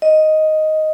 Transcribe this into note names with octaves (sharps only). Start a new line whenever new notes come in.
D#5